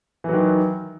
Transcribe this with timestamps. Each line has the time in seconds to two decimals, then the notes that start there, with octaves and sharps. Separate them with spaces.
0.24 E3
0.29 F#3
0.33 D#3